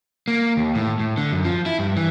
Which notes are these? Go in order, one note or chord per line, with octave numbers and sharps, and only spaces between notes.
A#3
D#2
A2
A2
D3
F#2
F3
E4
G2
E3